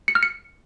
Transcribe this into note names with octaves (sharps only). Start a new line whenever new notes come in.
C#7
F6
C#7